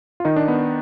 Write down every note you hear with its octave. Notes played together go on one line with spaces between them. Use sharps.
F4
D#3 D#4
D4
B3